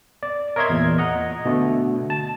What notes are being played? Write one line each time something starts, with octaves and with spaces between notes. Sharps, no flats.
D5
A#4 C#5 D#5 E5 C6 G#6
E2 A#2
D#5 F#5 A#5
B2 D3 A3
A5